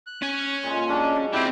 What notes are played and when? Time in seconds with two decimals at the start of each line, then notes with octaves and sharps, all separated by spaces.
0.07 F#6
0.22 C#4 G#5
0.63 A#2 G#3
0.88 G#2 F#3 D4
1.16 D5
1.33 D3 C4 E4 G4